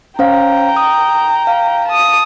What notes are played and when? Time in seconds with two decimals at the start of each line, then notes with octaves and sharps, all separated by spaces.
0.19 C#4 C5 F5 G5 A#5
0.77 D#6
1.47 F5
1.89 A5 D#6